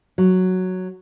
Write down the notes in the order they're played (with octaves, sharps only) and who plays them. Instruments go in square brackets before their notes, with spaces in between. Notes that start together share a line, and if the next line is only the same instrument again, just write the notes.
[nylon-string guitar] F#3